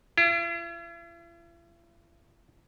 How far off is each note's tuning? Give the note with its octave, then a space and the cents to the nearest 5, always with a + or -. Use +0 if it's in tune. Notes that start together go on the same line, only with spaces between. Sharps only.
E4 +45